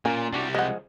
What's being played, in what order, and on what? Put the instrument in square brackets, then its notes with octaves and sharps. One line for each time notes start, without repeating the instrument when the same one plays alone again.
[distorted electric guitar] A#2 [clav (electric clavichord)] A#3 [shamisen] C#4 G#5
[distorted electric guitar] C2 G3 [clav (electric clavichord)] D4 F#4 G4
[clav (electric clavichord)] F3 G#3 [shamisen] D#5 F#5